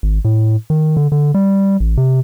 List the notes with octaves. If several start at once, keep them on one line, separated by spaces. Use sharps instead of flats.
G#1
A2
D#3
D3
D3
G3
A1
C3